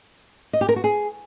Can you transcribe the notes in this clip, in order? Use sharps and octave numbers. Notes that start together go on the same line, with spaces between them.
D#5
G4
A#4
F#4
G#4